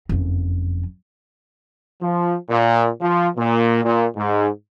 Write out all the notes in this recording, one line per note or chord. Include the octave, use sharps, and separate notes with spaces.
F#1 F2
F3
A#2
F3
A#2
A#2
G#2